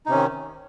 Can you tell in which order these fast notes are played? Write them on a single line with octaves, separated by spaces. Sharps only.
D#4 C3 C#4 D#3